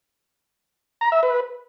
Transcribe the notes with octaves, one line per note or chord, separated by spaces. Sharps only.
A#5
E5
B4